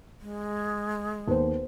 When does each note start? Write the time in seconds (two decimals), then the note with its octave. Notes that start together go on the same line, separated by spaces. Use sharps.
0.21 G#3
1.28 D#2 B3 C5